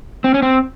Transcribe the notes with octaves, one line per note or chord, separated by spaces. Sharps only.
C4
C#4
C4